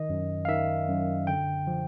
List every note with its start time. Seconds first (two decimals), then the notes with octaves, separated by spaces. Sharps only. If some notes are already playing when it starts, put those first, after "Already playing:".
Already playing: D#3 D#5
0.10 F#2
0.45 F5
0.48 D#3 E5
0.89 F#2
1.27 D3 G5
1.67 F3